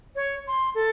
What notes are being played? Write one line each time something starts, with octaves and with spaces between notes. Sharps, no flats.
C#5
C6
A4